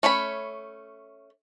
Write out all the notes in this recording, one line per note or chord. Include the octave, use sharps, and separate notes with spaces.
A3 C#4 C#5 B5